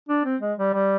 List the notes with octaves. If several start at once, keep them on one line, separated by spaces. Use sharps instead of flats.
D4
C4
G#3
G3
G3